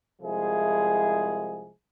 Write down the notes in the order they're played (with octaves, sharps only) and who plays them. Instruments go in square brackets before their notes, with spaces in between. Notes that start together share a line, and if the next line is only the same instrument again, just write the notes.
[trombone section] C2 F3 G#3 E4 G#4